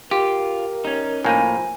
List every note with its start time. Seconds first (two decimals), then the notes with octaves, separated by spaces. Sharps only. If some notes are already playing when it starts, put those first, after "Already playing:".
0.11 F4 G4 A#4
0.85 C#4 D#4
1.24 A2 F3 A#3 G#5 G6 D#7